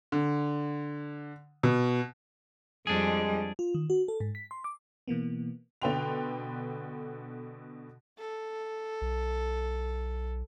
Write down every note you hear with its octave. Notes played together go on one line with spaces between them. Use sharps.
D3
B2
F2 G3 G#3 D4 G#4
F4
D#3
F#4
A4
G#2
B6
C6
D6
B2 E3 A#3 B3
B2 D3 B4 G5 C6 F7
A4
B1